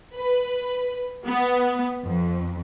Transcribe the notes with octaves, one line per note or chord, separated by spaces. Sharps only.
B4
B3
F2